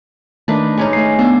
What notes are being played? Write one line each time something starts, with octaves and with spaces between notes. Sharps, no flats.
D#3 A3 A#3 D4 D#4 B4
G#3 C#4 D#4
A3 C7
B3 D4